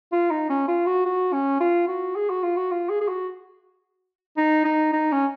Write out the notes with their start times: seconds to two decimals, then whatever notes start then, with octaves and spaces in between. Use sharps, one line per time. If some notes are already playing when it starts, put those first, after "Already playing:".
0.13 F4
0.31 D#4
0.50 C#4
0.68 F4
0.86 F#4
1.05 F#4
1.33 C#4
1.61 F4
1.88 F#4
2.16 G#4
2.30 F#4
2.43 F4
2.57 F#4
2.71 F4
2.90 G#4
3.01 G#4
3.08 F#4
4.37 D#4
4.65 D#4
4.93 D#4
5.12 C#4